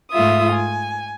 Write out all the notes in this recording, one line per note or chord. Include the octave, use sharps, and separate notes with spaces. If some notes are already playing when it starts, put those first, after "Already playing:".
G#2 A3 F4 E5 D#6
G#5